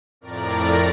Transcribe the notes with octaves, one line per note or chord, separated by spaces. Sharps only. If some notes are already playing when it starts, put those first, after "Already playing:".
F2 A2 A#4 D5